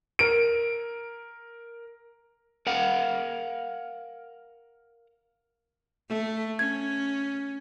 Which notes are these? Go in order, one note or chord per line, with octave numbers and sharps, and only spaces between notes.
A#4 D7
A#4 F5 F#5
A3
C#4 G#6